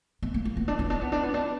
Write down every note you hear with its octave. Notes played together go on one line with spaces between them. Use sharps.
B3
A#3
A#3
B3
D4
B3
D4
B3
D4
B3
D4